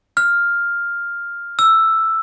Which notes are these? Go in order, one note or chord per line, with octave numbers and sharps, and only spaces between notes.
F6
E6